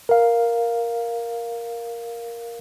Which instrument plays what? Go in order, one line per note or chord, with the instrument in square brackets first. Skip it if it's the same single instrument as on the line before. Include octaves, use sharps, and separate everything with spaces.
[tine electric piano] A#4 F5